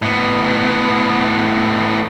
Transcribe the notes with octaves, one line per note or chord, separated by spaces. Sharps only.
A2 B3